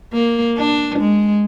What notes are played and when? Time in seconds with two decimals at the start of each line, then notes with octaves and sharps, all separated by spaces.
0.13 A#3
0.58 D4
0.99 G#3